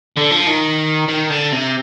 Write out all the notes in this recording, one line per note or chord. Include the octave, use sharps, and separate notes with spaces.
D3
F3
D#3
D#3
D3
C3